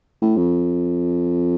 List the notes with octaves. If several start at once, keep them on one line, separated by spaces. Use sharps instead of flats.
A2
F2